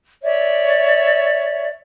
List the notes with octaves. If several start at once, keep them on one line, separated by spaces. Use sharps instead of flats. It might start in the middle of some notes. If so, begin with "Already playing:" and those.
C#5 D5 E5